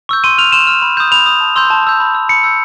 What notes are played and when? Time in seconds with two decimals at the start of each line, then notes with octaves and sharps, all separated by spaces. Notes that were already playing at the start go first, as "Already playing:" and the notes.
0.09 C#6 E6 G6
0.24 C6 D#7
0.38 F6 F7
0.52 C6 E7
0.67 F6
0.82 B5
0.97 D#6 G6
1.12 B5 F7
1.26 D#6 G6
1.41 A5
1.56 C6 E6 G6
1.70 A5
1.84 C6 E6 G6
2.00 B5
2.15 E6 G6
2.29 B5 C#7
2.44 E6 G6